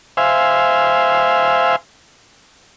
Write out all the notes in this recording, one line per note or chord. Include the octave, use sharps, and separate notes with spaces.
C5 E5 F5 G#5